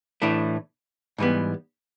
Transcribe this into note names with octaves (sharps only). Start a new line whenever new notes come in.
A2 E3 A3 D4
G#2 E3 G3 B3